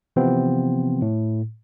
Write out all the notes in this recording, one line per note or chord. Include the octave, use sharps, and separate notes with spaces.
C3 E3 F3 B3 C4
A2